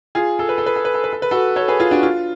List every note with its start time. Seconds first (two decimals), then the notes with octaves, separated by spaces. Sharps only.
0.15 F4 G#4
0.39 A4
0.49 B4
0.58 A4
0.66 B4
0.76 A4
0.85 B4
0.94 A4
1.04 B4
1.13 A4
1.22 B4
1.31 F#4 A4
1.56 A4 C#5
1.68 G#4 B4
1.79 F4 G#4
1.91 D4 F#4
2.03 F4